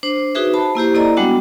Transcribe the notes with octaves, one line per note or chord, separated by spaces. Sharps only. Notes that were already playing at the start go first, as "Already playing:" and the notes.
D4 C5
D#4 F#4 G#4 B4 E5
C5 A5 B5
A#3 E4 G4 C5
A#3 E4 A4 D5 D#5 A#5
G3 G#3 B3 D4 F#4 F#5